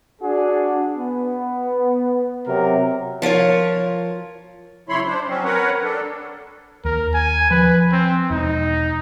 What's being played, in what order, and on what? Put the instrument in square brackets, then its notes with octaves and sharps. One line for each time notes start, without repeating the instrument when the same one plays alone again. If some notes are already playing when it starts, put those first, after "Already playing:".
[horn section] D4 F#4 G#4
B3
C3 F#3 A#4
[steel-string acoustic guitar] F3 F4 A#4 C#5
[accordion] C#3 F#3 E4 C#5 B5 C6
D4 C5
F#3 C4 C#4
A#4 B4 C#5 F#5
D4 A4
[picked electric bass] D#2 [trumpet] A#4
[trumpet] G#5
[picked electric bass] F3 [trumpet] B4
[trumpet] C4
[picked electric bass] E1 [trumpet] D#4